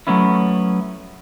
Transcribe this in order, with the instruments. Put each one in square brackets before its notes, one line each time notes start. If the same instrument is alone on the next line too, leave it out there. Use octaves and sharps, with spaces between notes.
[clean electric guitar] F#3 G#3 A3 B3 C#4 E4